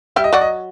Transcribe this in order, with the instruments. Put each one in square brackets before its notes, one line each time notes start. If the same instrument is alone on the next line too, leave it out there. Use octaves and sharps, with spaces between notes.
[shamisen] G3 G4 [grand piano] E5
[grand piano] D#5
[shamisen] F#3 F#4 [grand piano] D5
[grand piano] D#5